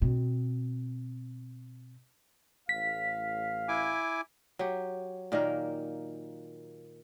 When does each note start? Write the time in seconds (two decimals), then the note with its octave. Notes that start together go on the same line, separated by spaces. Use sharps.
0.02 B2 C4
2.69 A1 A2 F5 B6
3.68 E4 G#5 D6
4.59 F#3 G4
5.32 A#2 D#3 A#3 A#4